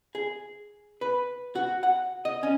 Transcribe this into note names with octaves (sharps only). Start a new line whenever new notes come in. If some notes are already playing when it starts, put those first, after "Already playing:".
G#4
B4
F#4
F#5
D#5
C#4